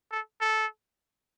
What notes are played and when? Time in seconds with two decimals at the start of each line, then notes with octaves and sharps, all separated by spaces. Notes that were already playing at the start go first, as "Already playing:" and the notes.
0.11 A4
0.41 A4